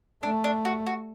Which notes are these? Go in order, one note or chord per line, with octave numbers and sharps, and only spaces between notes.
A3 D4
D4
F#4
F#4